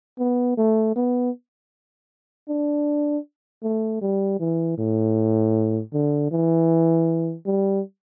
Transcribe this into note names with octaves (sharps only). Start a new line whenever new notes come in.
B3
A3
B3
D4
A3
G3
E3
A2
D3
E3
G3